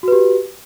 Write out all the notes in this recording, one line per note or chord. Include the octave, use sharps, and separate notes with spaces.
F#4 G4 B4